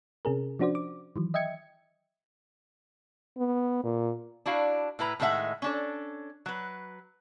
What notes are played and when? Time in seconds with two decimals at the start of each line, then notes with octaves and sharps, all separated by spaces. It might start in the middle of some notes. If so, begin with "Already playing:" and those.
0.25 C3 C#4 G#4 A#4
0.59 F3 C#4 D4 F#4 C5 D5
0.75 D6
1.16 D#3 E3 F#3
1.34 D#5 E5 G5 G#6 C#7
3.38 B3
3.84 A#2
4.46 D4 E4 F#4 F5
4.99 A2 E4 B4 A#5
5.20 A2 D#3 G#3 C4 E5 F#5
5.62 C#4 D4 A4
6.46 F#3 B4